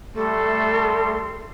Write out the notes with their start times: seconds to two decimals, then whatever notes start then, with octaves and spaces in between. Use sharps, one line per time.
0.16 G3 A3 A4 C6